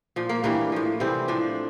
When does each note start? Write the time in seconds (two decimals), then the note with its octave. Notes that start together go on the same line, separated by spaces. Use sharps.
0.16 A#2 F3
0.29 A#3
0.44 G2 E3 G3 A#3
0.72 A2 F3
1.00 C3 E3 G3 C4
1.28 A2 F3 D4